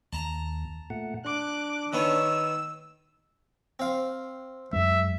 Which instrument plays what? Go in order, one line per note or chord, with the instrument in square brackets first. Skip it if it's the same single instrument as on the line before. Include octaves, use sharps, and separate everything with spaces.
[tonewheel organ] D#2 [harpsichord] A5 A#5
[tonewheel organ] A#2 A3 F#5
[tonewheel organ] D4 [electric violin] D6 F#6
[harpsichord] D#3 B3 C#5 [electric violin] E6
[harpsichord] C4 F5
[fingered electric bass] F#2 G#3 [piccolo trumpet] E5